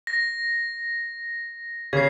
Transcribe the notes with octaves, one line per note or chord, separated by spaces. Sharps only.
A#6
C#3 G#6 C7